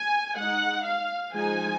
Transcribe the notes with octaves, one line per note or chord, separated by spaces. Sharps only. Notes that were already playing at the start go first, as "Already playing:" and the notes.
Already playing: G#5
G#3 D#4 F#5
F5
F3 G#3 D#4 G#5